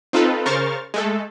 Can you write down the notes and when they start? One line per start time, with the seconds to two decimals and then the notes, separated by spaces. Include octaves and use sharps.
0.13 C4 D#4 F4 A4 B4
0.46 C#3 A#4 C5 C#6 F6 A6
0.94 G#3 A3 A4